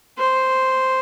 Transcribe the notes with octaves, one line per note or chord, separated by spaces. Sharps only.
C5